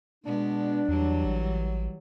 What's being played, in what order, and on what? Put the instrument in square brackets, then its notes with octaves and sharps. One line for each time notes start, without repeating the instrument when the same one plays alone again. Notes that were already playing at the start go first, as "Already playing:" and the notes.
[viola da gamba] B2 G#3 B3 [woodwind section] D4
[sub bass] E2 [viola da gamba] E3 F#3 G3
[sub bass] A1